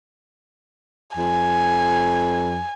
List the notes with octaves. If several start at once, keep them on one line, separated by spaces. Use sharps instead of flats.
F2 G#5